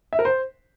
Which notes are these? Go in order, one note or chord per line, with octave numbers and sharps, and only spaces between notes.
E5
A#4
C5